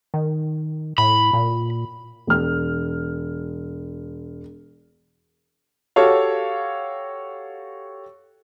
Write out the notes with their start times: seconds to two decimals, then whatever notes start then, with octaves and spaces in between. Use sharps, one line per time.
0.14 D#3
0.98 A2 B5
1.33 A#2
2.27 E1 F6
5.96 F#4 G4 A4 C#5 F5